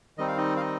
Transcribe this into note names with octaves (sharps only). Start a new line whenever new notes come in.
D#3 G3 C4 D#4 D#5
F5
D#4 D#5
F5
D#4 D#5